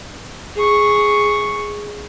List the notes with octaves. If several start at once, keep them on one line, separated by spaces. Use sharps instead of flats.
G#4 C#6